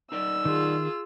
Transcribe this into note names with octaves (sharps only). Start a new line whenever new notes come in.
D#4 A#4 D5 E6
D#3 F4 G#4